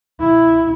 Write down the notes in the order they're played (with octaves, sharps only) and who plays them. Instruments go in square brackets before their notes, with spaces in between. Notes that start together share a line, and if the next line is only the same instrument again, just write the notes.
[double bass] E4